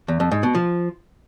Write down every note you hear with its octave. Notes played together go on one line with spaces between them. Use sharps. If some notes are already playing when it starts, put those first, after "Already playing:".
E2
F2
G#2
B2
F3